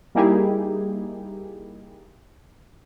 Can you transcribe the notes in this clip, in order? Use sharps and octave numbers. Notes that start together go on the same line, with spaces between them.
G3 A#3 D#4 E4 G4 G#4